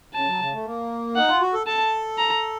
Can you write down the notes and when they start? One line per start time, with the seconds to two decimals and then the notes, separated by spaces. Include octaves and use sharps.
0.14 C#3 A5
0.27 F#3
0.40 C#3
0.52 A3
0.65 A#3
1.16 D#4 F#5
1.28 F4
1.41 F#4
1.54 A4
1.67 A4 A5
2.18 A#5